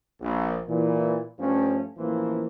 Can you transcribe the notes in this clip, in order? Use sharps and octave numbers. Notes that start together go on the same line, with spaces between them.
A#1
A#2 E3
G2 F3 A3 C#4
A1 E3 F3 A#3 E4 C5